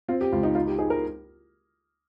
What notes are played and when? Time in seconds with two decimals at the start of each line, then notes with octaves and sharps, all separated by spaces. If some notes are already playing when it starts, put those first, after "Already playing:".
0.08 C4 F4
0.21 G4
0.32 C#2 F4
0.43 D#4
0.55 D#4 F4
0.67 G4
0.79 D#4 G#4
0.90 A#4